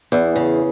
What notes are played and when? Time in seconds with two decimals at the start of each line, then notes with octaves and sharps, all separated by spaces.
0.12 E2
0.36 C#3